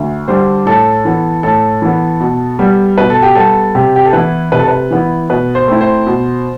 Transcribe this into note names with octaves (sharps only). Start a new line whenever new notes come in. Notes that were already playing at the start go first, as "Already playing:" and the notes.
Already playing: D2
D3 G3 D4 C5
A2 A4
E3 B3
A2 A4
E3 B3
B2
G3 B3
B2 B4
A4
G4
G3 B3 A4
C3 G4
G4
A4
E3 B3 E4 B4
C3 B4
A4
B4
E3 B3 E4
B2 B4
C5
A3 C4 E4
C5
B2